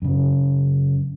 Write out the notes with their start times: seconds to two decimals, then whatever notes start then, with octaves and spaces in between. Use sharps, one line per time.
0.02 F#2 C#3